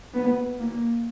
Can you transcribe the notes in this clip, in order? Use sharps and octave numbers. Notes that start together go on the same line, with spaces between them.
B3
A#3